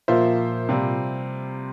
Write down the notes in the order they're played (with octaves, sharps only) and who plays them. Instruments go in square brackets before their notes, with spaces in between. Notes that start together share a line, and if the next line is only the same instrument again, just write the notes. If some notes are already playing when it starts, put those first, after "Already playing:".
[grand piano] A#2 [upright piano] F3 A#3 F4 C5 E5
[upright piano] C3 G3 C4 F4